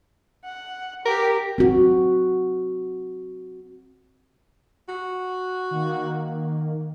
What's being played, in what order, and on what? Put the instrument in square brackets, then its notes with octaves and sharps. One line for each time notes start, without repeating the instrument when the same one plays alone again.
[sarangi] F#5
[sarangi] G4 [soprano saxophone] A#4
[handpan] C4 F#4
[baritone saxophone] F#4
[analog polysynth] D#3 A#3